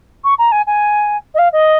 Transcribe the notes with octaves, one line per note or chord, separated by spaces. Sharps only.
C#6
A#5
G#5
G#5
D#5
F5
D#5